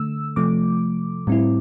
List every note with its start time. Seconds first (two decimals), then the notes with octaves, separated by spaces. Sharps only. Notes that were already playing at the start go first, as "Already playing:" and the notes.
Already playing: D3 A3 E6
0.36 C3 F3 A3 D6
1.27 A2 G3 C4 E4